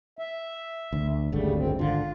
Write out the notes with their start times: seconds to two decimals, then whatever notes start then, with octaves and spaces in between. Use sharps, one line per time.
0.19 E5
0.93 D2
1.32 G#1 D2 C#3 G3 A3
1.56 F#2 C4
1.79 G#1 D3 F4